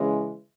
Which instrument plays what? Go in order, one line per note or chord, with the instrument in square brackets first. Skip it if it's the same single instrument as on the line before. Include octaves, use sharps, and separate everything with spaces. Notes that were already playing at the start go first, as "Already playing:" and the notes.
Already playing: [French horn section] C#3 E3 G#3 C#4